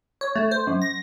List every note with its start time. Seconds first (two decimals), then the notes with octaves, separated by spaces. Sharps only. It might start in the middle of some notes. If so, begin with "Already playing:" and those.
0.21 C#5
0.36 A3
0.51 C5
0.67 F#2
0.82 A#6